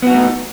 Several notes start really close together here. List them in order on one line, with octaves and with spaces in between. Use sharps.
B3 F#4 D#4 A3